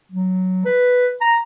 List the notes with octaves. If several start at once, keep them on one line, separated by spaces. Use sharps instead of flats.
F#3
B4
A#5